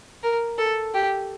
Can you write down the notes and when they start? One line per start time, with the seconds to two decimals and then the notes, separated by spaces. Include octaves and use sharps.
0.23 A#4
0.58 A4
0.94 G4